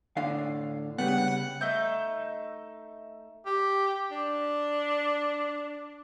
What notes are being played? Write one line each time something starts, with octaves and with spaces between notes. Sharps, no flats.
A2 D3 F5
C#3 G3 B3 F#5
A3 D#4 E5 G6
G4
D4